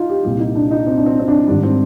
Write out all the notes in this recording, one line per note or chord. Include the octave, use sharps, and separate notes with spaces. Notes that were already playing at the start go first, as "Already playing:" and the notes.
Already playing: D#4 F4
G4
C2 A#2 G3 G4
D#4
D4
D#4
C4
D4
C4
C4
D4
G#2 D#3 G3 D4
C4